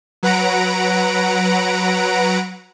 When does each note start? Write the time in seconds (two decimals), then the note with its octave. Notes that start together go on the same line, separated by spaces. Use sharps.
0.23 F#3 B4 F#5 A#5 D7